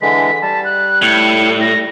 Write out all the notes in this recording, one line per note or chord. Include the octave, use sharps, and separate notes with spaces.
D3 E3 G#3 B6
G3 A5
F#6
A2 C#7
A#6